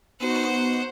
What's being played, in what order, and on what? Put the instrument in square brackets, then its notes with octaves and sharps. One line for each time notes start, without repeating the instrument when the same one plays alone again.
[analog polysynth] B3 D#4 F#4 [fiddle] C5 F#5